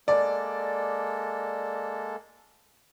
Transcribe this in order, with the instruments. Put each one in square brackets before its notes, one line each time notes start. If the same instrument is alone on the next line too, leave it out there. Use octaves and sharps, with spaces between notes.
[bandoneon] G#3 A#3 A4 [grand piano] D5